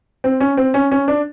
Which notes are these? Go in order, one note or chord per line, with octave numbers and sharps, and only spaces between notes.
C4
C#4
C4
C#4
C#4
D4